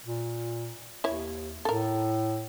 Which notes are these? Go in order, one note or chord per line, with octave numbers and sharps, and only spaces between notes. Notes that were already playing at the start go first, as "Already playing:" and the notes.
A#2
D#2 E4 C#5
A2 A4 A#4